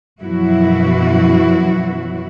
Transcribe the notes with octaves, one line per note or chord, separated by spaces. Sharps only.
F#2 B2 E3 F3 E4 F#4